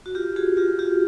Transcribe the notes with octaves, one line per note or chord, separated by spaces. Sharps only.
F#4
F4 G4
F#4 G#4
F4 G4
F4 G4